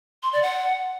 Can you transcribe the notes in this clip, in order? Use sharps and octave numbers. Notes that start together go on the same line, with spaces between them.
C6
D5
F#5